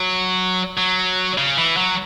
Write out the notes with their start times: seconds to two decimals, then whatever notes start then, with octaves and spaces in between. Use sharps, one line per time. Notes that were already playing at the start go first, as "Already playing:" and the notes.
Already playing: F#3
0.78 F#3
1.38 C#3
1.58 E3
1.77 F#3